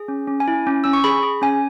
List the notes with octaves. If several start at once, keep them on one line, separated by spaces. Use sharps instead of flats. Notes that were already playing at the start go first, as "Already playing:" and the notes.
Already playing: G#4
C#4
C#4
G#5
E4
C#4
C#4 E6
C#6
G#4 B5
G#4
C#4 G#5